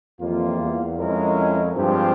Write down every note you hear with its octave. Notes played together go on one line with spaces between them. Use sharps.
F2 E3 G3 A#3 F4
E2
F2 G#3 C#4 E4 A#4
G2 F3 G#3 C4 G4 C5